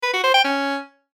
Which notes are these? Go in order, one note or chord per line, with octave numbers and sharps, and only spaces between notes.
B4
F#4
C5
G5
C#4